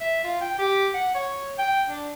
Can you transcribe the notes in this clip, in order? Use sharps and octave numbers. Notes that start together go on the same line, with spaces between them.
E5
F4
G5
G4
F#5
C#5
G5
D4